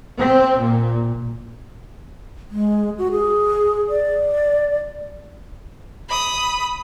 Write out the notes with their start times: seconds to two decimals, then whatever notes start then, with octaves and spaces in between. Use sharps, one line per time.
0.18 C4
0.59 A#2
2.51 G#3
2.98 F#4
3.11 G#4
3.89 D5
6.09 B5 D#6